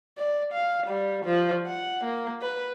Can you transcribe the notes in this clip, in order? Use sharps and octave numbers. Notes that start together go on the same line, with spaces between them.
D5
F5
G3
F3
F#5
A#3
B4